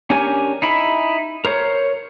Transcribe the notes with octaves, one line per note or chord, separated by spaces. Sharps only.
C#4 D4 G4 A#4 G#5
D#4 E4 B5
A#4 C5 C#5